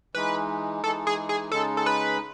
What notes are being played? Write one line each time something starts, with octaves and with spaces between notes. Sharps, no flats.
E3 G#3 D#4 B4
E3 G#3 D#4 A4
G#4
G#4
C#3 G#3 D#4 A4
A4
B4